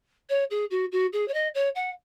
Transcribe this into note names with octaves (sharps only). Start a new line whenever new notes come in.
C#5
G#4
F#4
F#4
G#4
C#5
D#5
C#5
F#5